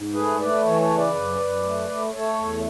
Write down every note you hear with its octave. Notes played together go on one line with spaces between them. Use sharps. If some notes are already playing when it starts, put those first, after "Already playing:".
Already playing: G#2
A3 G#4 B4
A3 B4 D5
E3 A4 C#5
A4 C#5
C#3
B4 D5
F#2
F#2
A3
A3
A3 A4 C#5
E2